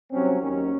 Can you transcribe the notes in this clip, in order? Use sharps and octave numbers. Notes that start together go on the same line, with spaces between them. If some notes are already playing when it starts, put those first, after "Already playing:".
C2 C3 F#3 C4 C#4
D#2 D#3 F#3 C#4